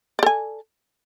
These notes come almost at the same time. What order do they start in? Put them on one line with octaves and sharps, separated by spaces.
D5 A4 G#5